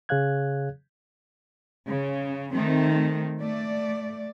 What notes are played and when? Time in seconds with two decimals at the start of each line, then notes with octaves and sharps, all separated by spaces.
0.09 C#3 G#4 C#5 F5 F#6 G#6
1.87 C#3
2.51 D#3 A3 C4
3.39 A3 D5